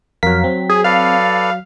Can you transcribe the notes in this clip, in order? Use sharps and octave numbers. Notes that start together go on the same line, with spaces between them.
F2 F#3 A#4 F5 B6
C4
G#4
A4 B4 D5 F5